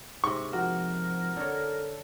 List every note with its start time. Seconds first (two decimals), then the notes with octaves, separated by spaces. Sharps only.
0.24 G#2 C3 C#6
0.53 F3 F#4 A#4
1.37 D3 A4 C#5